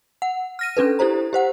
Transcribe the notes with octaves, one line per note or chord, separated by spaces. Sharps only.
F#5
F6 A#6 D#7
C#4 D4 A4 B4
E4 G4 A4 C5 A#5
G4 C5 F#5